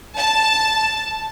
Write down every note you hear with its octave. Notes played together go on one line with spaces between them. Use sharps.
A5